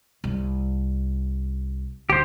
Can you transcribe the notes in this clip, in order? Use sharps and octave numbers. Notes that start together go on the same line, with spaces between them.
C2
D2 G4 C5